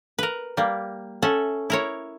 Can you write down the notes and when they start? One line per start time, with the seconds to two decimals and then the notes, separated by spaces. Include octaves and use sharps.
0.19 A#4 B4
0.57 G3 A#3
1.22 C#4 A4 E5 F#5
1.70 E4 A#4 C#5